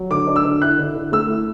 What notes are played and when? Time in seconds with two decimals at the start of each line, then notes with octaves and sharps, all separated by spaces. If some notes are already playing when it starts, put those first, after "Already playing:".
Already playing: F#3
0.10 D3 D6
0.27 D4
0.36 E6
0.45 D3
0.62 E4 F#6
0.78 D3
0.95 D3
1.12 A3 E6
1.29 E4